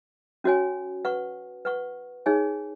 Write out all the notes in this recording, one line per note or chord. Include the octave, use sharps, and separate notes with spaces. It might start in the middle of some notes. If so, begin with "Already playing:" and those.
C#4 F#4 C#5 G#5
B4 F#5 C#6
B4 F#5 C#6
D#4 G#4 C#5 G#5